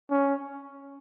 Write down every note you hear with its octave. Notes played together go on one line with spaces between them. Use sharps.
C#4